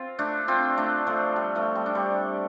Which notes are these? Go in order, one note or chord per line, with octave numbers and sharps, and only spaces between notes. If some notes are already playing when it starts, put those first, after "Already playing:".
Already playing: C4 F4
A3 D4
C4 F4
A3 D4
F3 A3
G3
F3 A3
G3 C4
D4
G3 C4